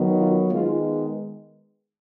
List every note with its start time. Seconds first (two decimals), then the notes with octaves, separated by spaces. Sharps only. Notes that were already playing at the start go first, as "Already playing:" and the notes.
Already playing: D#3 F#3 B3
0.18 F4
0.50 D#3 G#3 B3 F4